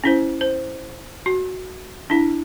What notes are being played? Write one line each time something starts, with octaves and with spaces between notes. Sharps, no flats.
C#4 E4 C5
C5
F#4
D4 E4